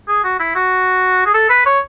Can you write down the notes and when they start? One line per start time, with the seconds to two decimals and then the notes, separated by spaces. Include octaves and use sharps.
0.08 G#4
0.24 F#4
0.40 E4
0.55 F#4
1.26 G#4
1.34 A4
1.50 B4
1.66 C#5